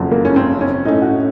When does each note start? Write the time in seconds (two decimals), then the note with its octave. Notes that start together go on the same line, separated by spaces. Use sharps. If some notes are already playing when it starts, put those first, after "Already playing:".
Already playing: F#1 F2 C#3 F#3
0.12 A#3
0.25 C#4
0.36 C4
0.61 C#4
0.85 A2 A3 C#4 D#4
1.02 F#4